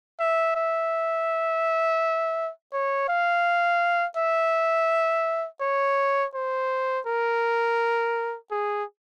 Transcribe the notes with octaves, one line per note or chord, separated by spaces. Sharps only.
E5
E5
C#5
F5
E5
C#5
C5
A#4
G#4